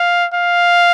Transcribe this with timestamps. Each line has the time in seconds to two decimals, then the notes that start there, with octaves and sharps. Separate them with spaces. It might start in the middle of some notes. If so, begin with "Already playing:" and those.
Already playing: F5
0.34 F5